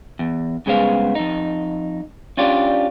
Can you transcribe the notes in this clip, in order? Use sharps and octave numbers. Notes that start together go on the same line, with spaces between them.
E2
G2 C#3 G#3 B3 C5 F5
F2 D#4
C#4 D4 F4 G4 D5